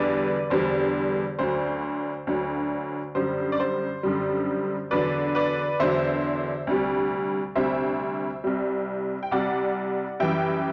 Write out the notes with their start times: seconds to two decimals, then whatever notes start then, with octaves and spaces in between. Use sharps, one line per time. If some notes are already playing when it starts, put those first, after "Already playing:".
Already playing: E2 D3 G3 B4 D5
0.50 E2 D3 G3 C5
1.39 D2 D3 F#3 C5
2.27 D2 D3 F#3
3.15 F#2 D3 G3 C5
3.52 D5
3.60 C5
4.03 F#2 D3 G3
4.91 E2 D3 F#3 B4 D5
5.35 B4 D5
5.80 E2 D3 F#3 C5 E5
6.67 D2 C3 G3
7.56 D2 C3 G3 C5 E5
8.44 C2 C3 G3
9.23 G5
9.31 C2 C3 G3 D5 F#5
10.20 F#2 E3 G3 E5 G5